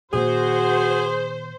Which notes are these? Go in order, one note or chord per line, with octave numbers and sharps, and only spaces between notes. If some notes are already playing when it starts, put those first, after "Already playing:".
A#2 D#3 F#4 G#4 C5